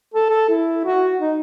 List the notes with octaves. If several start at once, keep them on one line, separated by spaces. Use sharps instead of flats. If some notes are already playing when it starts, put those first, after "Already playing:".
A4
A4
E4
F#4
D#4